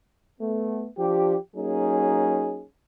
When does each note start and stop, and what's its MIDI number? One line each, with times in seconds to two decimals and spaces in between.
0.40 0.88 57
0.40 0.88 59
0.98 1.36 53
0.98 1.36 62
0.98 1.36 67
1.56 2.65 54
1.56 2.65 58
1.56 2.65 61
1.56 2.65 63
1.56 2.65 68